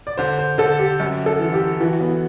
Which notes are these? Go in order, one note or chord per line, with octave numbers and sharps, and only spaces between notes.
D5
D3 C5
C5
D3 A4
G4
F#2
A4
E3
G4
E3 F#4
B3